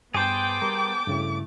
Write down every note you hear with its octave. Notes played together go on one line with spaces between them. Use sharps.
G2 B3 G#4 C5 G5 A5 D6
G3 A#4 A#5
G2 C#3 A3 E4